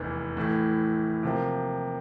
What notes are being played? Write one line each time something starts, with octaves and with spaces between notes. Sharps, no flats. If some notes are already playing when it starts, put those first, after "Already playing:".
Already playing: F1 E2 E3
A2 E3 A3
C3 F3 A#3